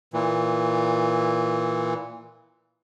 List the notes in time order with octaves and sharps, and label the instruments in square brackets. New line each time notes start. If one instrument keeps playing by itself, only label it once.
[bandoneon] A#2 E3